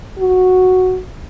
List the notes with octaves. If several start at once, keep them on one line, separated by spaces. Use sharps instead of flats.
F#4